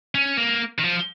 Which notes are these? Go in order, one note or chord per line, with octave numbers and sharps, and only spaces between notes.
C#4
A#3
D#3
F3